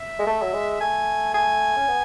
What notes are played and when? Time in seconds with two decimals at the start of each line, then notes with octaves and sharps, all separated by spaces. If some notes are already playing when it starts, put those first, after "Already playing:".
Already playing: E5
0.19 G#3
0.27 A3
0.42 F#3
0.53 G#3
0.81 A3 G#5
1.34 G#5
1.76 C#4
1.88 B3